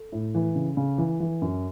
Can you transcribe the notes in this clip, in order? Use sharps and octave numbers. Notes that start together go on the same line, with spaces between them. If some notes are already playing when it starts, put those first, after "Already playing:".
Already playing: A4
A2
E3
C#3
C#3
E3
E3
F#2